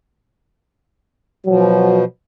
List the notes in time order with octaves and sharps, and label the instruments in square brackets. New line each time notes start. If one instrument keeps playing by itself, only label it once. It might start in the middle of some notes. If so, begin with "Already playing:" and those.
[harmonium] B2 F3 [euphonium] F#3